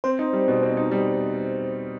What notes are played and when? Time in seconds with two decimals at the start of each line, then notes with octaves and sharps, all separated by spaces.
0.04 C4 C5
0.19 D#4
0.33 G3
0.48 B2
0.62 C4
0.77 D#4
0.91 G3